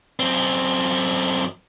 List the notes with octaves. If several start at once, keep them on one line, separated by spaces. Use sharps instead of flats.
F#2 C4